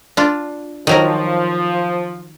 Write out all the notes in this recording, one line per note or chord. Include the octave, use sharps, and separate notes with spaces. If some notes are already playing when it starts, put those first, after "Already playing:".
D4 F4
D#3 F3 F#3 A#4